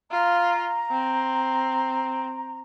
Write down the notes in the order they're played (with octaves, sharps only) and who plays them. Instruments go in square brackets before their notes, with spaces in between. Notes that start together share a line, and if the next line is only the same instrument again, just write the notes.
[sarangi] F4 [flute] A#5
[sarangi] C4